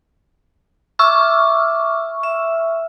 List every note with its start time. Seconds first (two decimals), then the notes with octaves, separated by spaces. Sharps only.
0.99 E5 C#6 D6 E6 F6
2.23 E5